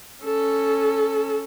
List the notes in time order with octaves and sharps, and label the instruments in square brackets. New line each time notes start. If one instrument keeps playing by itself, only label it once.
[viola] C#4 A4